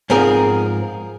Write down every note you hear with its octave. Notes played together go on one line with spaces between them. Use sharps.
G#2 F3 C4 G#4 A#4